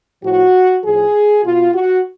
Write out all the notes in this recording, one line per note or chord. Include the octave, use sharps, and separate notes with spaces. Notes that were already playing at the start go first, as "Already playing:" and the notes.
A2 F3 F#4
A2 F3 G#4
B2 F4
F#4